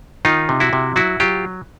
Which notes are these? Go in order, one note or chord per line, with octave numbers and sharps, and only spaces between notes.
D#3 D#4 F4
C3
E4 F#4
C3
F#3 E4 F#4
F#3 F4 G4